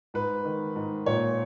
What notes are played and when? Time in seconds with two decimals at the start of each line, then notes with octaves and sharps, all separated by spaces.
0.14 G#2 B4
0.45 D#3
0.76 G#2
1.06 A#2 C#5